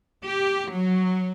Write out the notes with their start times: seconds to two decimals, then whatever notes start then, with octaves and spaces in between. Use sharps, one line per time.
0.24 G4
0.70 F#3